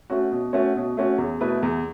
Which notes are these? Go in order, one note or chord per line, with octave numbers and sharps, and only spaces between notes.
A3 C#4 F#4
B2
A3 C#4 F#4
B2
A3 C#4 F#4
E2
B2 A3 E4 B4
E2